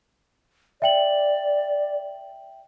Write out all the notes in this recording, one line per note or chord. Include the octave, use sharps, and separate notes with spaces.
D5 E5 G5 F#7